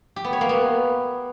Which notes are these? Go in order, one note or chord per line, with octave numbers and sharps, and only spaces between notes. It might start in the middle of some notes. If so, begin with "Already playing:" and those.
G4
B3
C#5
A#3
B3